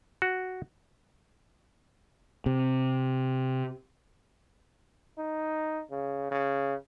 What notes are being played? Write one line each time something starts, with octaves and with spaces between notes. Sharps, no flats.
F#4
C3
D#4
C#3
C#3